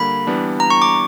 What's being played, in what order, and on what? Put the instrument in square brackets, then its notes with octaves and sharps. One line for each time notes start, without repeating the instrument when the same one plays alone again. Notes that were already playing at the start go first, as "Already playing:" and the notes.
Already playing: [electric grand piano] D3 G3 A#3 [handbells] B5
[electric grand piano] E3 G3 B3 D4
[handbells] A#5
C#6
D6